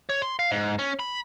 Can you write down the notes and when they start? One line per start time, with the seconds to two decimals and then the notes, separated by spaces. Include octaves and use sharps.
0.09 C#5
0.22 C6
0.39 F5
0.51 G#2
0.79 C#4
0.99 B5